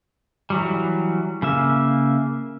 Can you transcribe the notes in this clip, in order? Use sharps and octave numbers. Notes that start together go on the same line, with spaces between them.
E3 F#3 G3
C#3 A#3 E5